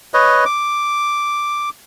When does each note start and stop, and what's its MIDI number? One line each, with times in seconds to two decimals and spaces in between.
0.14 0.44 71
0.14 0.44 73
0.14 0.44 75
0.45 1.70 86